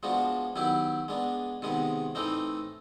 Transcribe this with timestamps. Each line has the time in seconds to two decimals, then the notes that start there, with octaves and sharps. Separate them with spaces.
0.03 F3 G#3 B3 D4 F#4
0.56 D#3 F#3 B3 E4 G4
1.08 G#3 B3 D4
1.62 C3 D#3 G#3 B3
2.15 A2 E3 A3 C4 D#4